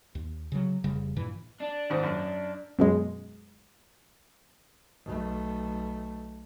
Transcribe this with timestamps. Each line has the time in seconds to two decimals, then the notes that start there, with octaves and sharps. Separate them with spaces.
0.15 D#2
0.52 C#3 E3 F#3
0.84 F1 C#3 G3
1.16 G2 A#2 E3
1.60 D4
1.90 D#2 G#2
2.03 F#2
2.79 F#2 B2 G#3
5.05 B1 A3